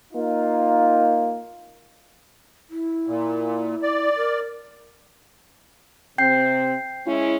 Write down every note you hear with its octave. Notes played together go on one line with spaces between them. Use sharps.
A#3 D#4 F4
E4
A#2
D5
A#4
C3 C4 G5 G6 C7
G#3 C#4 E4